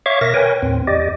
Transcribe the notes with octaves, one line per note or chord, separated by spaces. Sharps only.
C#5 E5 F5 C#6 D6
B2 A#4 E5 A#6
A#4 B4 C#5 G5 G#5
D#2 A2 C4
E2 G4 D5 D#5